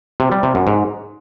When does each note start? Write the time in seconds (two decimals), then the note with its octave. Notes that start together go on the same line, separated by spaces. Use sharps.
0.20 C3
0.32 G3
0.43 C3
0.55 F#2
0.67 G#2